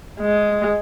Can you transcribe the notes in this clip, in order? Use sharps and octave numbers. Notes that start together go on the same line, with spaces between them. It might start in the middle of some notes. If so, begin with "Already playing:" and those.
G#3